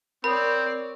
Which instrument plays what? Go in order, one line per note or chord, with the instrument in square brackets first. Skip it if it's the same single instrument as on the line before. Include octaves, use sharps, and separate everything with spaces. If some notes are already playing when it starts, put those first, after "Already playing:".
[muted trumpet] C4 [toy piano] A#4 D#6 [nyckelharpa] C#5 D5 [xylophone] B5